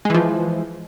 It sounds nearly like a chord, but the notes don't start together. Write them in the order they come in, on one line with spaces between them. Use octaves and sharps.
G#3 E3 F3